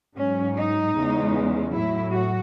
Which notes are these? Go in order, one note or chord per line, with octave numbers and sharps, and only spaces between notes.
G#2 F#3 C#4
D#4
E2 C#3 G#3
A2 F#3 E4
F#4